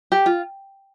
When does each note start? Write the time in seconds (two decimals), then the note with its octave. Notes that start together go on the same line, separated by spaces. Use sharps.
0.12 G4
0.26 F4